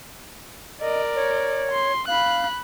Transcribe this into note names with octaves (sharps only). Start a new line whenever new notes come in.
A#4 D5 D#5
C#5
C6
F5 B5 F#6